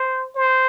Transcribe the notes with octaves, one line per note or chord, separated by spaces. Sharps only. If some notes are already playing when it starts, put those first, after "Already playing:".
Already playing: C5
C5